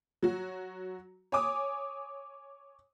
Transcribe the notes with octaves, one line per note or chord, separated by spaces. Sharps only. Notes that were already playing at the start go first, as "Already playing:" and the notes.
F#3 F#4
C#5 G#5 D6 D#6